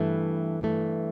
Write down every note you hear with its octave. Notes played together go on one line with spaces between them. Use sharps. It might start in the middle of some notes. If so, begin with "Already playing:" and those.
Already playing: G2 E3 A3
G2 E3 A3